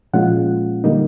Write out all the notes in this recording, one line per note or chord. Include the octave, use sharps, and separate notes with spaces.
A#2 F3 G#3 C#4 F4 F#5
D3 G3 A#3 D#4